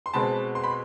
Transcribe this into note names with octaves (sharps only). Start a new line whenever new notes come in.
C6
B2 G#3 C4 A5 B5
C6
B5